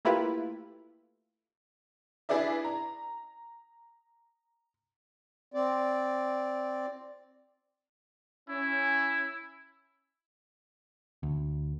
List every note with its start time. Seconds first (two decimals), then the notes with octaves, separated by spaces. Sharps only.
0.05 A3 A#3 E4 F4 G4 B4
2.29 D4 E4 G#4 B4 D5 E5
2.64 A#5
5.54 C4 D5
8.49 C#4 E4
11.23 D2